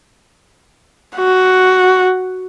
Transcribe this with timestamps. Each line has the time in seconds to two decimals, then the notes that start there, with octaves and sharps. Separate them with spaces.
1.17 F#4